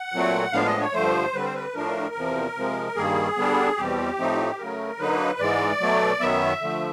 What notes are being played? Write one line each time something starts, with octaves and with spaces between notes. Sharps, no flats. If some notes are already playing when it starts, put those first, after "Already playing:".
Already playing: F#5
A#2 F#3 A3 C4
A2 F3 G#3 B3 D4 F5
D#5
C#5
G2 D3 F3 A3 C5
D3 G3 C4 B4
C5
B4
A2 F3 A3 D4 A#4
E2 C3 F3
C3 F3 G#3
G2 D#3 G3 A#3 G#4
D3 G3 B3 D4
E2 B2 G3 C4 G4
A2 F3 A3 C4 D#4
C#3 F#3 A3 A#4
D3 F#3 A#3 D#4 B4
G#2 E3 G#3 D5
B2 F#3 A3
F#2 D#3 F#3 B3 E5
D3 F3 A3